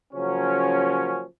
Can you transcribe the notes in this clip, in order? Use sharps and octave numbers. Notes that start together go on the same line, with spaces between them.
C#3 F3 F#3 A#3 C#4